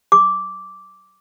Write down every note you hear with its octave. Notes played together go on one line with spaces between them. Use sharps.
D6